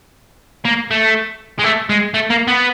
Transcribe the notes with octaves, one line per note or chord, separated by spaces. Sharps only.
A#3
A3
G#3
A3
G#3
A3
A#3
B3